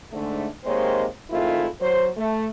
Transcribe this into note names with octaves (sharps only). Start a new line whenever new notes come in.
G#2 D3 A3
C3 D#3 G#3 A#3 C5 C#5
D#3 G#3 A3 C4 E4 F4
F#3 C5
A3